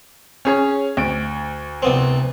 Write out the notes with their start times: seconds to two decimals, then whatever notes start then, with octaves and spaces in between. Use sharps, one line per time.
0.45 C#4 G#4 C#5
0.97 D2 D7
1.82 C2 B3 C4